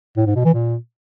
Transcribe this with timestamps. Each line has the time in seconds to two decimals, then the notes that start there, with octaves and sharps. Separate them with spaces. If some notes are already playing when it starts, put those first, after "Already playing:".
0.17 A2
0.26 G#2
0.35 B2
0.45 E3
0.54 A#2